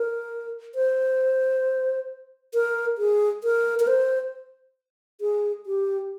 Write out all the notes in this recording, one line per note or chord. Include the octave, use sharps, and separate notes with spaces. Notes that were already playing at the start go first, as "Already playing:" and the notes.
Already playing: A#4
C5
A#4
G#4
A#4
A#4
C5
G#4
G4